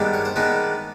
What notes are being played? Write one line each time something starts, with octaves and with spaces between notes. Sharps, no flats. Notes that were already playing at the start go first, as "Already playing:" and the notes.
Already playing: G2 D#3 G#3 B3 D4
C#5
C5
D#3 G#3 B3 D4 B4